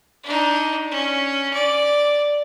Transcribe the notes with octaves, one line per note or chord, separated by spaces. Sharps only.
D4 D#4
C#4
D5